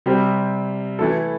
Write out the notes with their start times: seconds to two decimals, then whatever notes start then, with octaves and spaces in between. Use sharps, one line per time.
0.06 C3 G3 C4
0.99 E3 A3 E4 A4